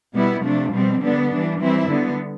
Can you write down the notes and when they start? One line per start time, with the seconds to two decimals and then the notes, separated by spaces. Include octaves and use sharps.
0.13 B2 G3 B3 E4
0.41 C3 F3 A3 D4
0.71 B2 G3 C4
1.01 D3 G3 B3 D4
1.29 E3 G3 D4
1.59 E3 G3 C4 E4
1.88 D3 G3 B3